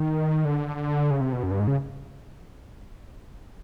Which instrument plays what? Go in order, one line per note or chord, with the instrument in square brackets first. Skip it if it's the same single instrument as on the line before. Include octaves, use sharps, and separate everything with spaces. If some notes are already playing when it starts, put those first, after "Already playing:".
Already playing: [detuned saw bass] D#3
D3
C#3
C3
B2
F#2
G2
G#2
C#3